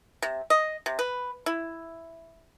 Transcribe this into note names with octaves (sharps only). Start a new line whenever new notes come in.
C3
D#5
C3
B4
E4